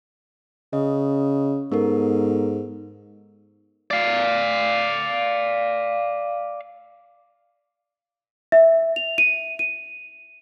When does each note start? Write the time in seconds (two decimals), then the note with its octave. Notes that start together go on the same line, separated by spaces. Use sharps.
0.73 C#3 D#5
1.72 G#2 B3 A4 A#4
3.91 D5 F5
8.52 E5
8.96 F7
9.18 D#7
9.59 D#7